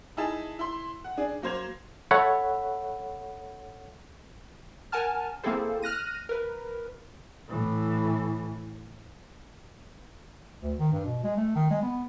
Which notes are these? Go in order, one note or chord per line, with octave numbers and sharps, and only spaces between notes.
D#4 E4 G#4 A5
E4 C6
F#5
D4 G#4
F#3 A#3 C5 G#6 F7
A4 C#5 E5 F#5 B5
A#4 F#5 G#5 A5 F6
A#3 C4 E4 G#4 A4 C5
F6 F#6 A#6 D#7
A#4 B4
A2 E3
D2
D#3
G2
B2
G#3
A3
D#3
G#3
B3